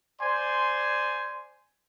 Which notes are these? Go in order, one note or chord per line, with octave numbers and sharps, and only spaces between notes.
C5 D5 G#5 C6